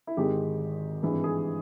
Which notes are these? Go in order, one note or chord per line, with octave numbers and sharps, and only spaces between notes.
E4
G#1 G#2 D#3 G#3 G4
G#1 G2 E3 G#3
G#4